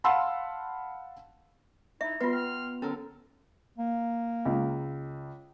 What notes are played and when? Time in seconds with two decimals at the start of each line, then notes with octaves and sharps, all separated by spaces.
0.04 F5 F#5 A5 B5 C6 E6
2.01 D#4 E4 E5
2.20 G3 B3 F4 B4 C6
2.33 G5 C6 F6
2.82 D3 F#3 C#4 A4 A#4
3.78 A#3
4.46 C#2